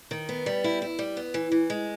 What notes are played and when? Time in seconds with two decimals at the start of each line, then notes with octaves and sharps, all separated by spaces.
0.11 D#3
0.29 B3
0.46 G3
0.64 E4
0.82 E4
0.99 G3
1.17 B3
1.34 E3
1.52 E3
1.70 G#3